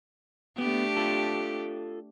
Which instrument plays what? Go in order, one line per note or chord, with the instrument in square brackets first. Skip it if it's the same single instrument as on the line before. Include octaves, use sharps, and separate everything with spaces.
[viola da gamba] A3 D4 G4 [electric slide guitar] B3
[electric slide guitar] F4 A4